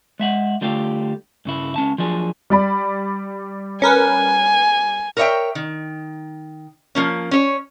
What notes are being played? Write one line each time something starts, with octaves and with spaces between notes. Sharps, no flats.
G#3 E5 F#5
D3 G3 A3 F4 G4
G2 C#3 E4
C#2 C#4 A5
F3 F#3 D4 G#4
G3 D5 B5
C#4 A#4 B4 G#5
A#4 B4 C#5 D#5 E5 G5
D#3
F3 A#3 C#4
C#4 C#5